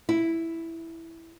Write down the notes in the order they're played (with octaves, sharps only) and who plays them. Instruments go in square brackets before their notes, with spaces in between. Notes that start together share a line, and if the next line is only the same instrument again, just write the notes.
[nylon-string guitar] E4